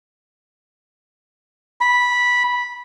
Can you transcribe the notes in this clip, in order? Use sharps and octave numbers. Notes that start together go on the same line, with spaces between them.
B5